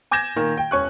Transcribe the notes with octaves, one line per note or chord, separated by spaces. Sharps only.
G#5 D6 G6 G#6 A#6 E7
A#2 D#3
G5
E1 C#4 C#6 F#6